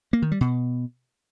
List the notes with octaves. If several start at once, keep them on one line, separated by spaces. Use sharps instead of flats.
A#3
D#3
G3
B2